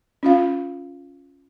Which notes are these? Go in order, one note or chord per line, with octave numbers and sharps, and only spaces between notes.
C#4 F4 F5